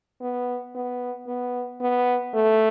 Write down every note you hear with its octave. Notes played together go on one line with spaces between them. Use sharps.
B3
B3
B3
B3
A3